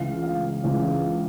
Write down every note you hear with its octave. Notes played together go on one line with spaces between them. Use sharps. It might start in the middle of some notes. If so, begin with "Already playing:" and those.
Already playing: C#2 C#3 E3 F5
F5
C#2 C#3 E3